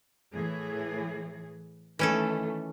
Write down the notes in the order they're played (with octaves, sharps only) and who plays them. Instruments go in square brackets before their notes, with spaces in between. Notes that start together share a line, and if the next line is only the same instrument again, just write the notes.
[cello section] A2 E3 G#4
[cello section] D#3 A3 [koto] E3 C#4 A4